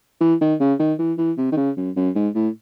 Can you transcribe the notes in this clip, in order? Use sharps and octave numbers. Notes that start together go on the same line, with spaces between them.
E3
D#3
C#3
D#3
E3
E3
C3
D#3
C#3
F#2
F#2
G#2
A2